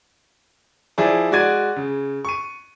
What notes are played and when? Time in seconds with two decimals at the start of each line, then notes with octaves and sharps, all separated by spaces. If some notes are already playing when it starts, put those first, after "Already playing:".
0.98 F3 E4 G#4 D5
1.31 G#3 F#4 D5 G#6 D#7
1.76 C#3
2.25 C#6 D#7